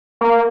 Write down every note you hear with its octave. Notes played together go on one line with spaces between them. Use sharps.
A#3